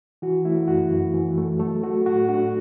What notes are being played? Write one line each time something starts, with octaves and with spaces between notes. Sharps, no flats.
E3 F#4
A3 E4
F#2 F#4
F#2
E3
A3
F#3 A3 A4
A3 F#4
A2 F#4
D4 F#4